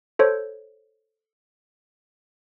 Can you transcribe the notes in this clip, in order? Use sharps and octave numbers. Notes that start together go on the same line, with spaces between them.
A4 C5 C#5